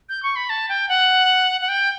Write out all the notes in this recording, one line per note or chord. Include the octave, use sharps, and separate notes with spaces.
G6
C#6
B5
A5
G5
F#5
F#5
G5